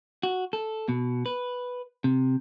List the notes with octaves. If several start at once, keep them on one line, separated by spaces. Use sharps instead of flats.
F#4
A4
B2
B4
C3